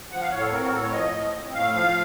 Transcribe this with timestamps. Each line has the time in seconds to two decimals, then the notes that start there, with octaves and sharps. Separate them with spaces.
0.11 F3 F#5
0.21 F5
0.31 A2 C#5
0.41 A4
0.52 C4 A#4
0.61 F#4
0.72 A2 A4
0.82 C#5
0.92 F3 D#5
1.13 A2
1.33 C4
1.54 A2 F5
1.74 F3 F5